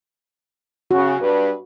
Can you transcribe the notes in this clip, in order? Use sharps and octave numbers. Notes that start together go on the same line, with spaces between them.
C#3 F#4
G2 B4